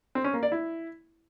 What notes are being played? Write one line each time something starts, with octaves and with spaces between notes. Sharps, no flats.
C4
C#4
A#3
D5
E4